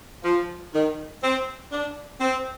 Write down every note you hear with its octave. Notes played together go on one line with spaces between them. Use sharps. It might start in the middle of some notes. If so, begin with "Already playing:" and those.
F3
D#3
C4
D4
C4